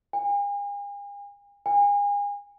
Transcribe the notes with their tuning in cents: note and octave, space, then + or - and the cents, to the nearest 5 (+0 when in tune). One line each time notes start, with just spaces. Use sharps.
G#5 -45
G#5 -35